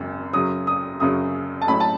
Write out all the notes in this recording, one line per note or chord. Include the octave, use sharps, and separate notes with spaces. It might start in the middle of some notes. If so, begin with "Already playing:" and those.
Already playing: G#1 F#2 C#3
F#2 C#3 F#3 D#6
D#6
F#2 C#3 F#3 D#6
A5
A1 A2 F#3 C#4 B5
A5